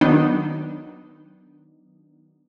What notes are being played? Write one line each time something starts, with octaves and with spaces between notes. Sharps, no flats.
D#3 F#3 B3 D4 D#4